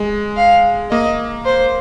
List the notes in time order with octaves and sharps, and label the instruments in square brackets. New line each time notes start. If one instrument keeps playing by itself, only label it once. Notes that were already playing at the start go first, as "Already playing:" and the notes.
Already playing: [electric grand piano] G#3
[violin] F5
[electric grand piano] A#3 [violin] D#5
[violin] C5